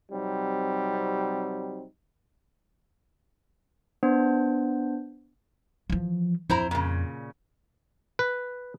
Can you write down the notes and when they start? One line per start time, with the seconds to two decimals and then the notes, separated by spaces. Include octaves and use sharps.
0.12 C3 F#3 G3 C4 D#4
4.03 B3 D4 C5
5.90 E3 F3
6.50 F2 E4 C5 A#5
6.71 A#2 C#3
8.19 B4